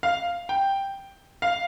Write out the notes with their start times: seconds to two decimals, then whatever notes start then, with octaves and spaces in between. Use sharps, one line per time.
0.03 F5
0.49 G5
1.42 F5